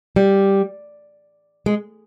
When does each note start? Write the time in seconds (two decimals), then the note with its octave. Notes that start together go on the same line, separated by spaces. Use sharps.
0.16 G3
1.66 G#3